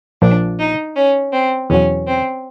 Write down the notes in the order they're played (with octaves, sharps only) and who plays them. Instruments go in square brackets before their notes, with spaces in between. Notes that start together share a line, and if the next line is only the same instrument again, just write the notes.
[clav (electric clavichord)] A#1 A#2 F3 [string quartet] D4
[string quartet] D#4
C#4
C4
[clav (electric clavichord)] E2 B2 F#3 [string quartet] C#4
[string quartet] C4